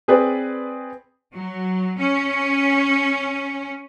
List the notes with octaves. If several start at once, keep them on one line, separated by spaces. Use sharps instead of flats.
C4 G#4 B4 D5
F#3
C#4